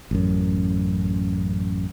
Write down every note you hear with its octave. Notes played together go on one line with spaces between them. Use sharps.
A1 F#2